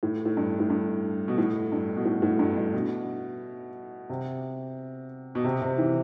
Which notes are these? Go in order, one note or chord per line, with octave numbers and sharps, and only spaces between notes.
A2
A2
G2
A2
G2
B2
A2
G2
B2
A2
A2
G2
G2
B2
C3
B2
C3
C3
E3